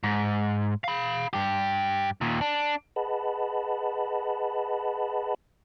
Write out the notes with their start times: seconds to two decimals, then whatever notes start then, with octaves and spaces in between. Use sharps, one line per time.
0.03 G#2
0.84 F5 B5
1.33 G2 G4
2.21 D#2 A#2
2.41 D4
2.96 G#4 B4 D#5 F#5 A5 B5